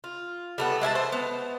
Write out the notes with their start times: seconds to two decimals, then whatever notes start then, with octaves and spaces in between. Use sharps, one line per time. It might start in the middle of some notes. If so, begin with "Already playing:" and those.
0.04 F4
0.58 G3 A3 B3
0.81 G#3 E4 G#5 A5
0.95 C5
1.12 B3